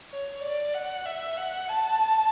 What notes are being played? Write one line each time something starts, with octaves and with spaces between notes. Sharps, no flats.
C#5
D5
F#5
E5
F#5
A5